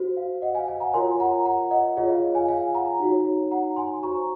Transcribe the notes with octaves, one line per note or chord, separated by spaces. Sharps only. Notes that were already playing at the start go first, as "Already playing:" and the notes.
Already playing: F#4 C5
F5
D#5 F#5
F5 G#5
F5 G#5
F#5 A#5
F4 A#4 C#5 G#5 C6
F#5 A#5
F#5 A#5
D#5 F#5
F4 G#4 C#5 D#5
F5
F5 G#5
F5 G#5
F#5 A#5
D#4 F#4 C#5
F#5 A#5
G#5 C6
F#4 C5 A#5 C#6